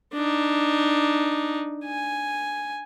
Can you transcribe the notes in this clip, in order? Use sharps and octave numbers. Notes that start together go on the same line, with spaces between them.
D4 D#4
G#5